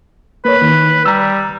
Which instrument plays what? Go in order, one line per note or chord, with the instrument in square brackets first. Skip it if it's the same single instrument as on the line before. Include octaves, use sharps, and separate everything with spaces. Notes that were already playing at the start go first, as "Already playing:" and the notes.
[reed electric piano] A#3 C#5 [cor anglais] B4
[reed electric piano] D#3
[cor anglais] G3 [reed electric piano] A#5 E6